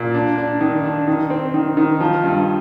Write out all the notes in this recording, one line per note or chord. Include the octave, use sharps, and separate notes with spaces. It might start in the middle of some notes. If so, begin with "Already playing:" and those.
Already playing: A#2
D4
D4
D#3
D4
D#3
C4
D#3
D#3
F3
G2